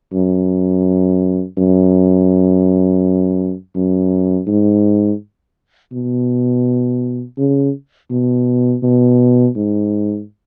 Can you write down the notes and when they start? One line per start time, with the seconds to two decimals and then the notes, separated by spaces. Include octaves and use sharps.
0.13 F#2
1.57 F#2
3.75 F#2
4.47 G#2
5.92 B2
7.38 C#3
8.11 B2
8.83 B2
9.56 G#2